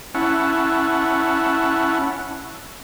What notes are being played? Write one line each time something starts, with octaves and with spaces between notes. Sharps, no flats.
C#4 E4 F#5 A5